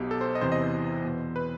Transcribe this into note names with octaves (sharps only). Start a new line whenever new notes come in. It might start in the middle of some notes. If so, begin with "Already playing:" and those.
Already playing: B1 B2 G4
A4
C5
D#5
E2 C3 E3 C5
D#5
C5
E2 B2
B4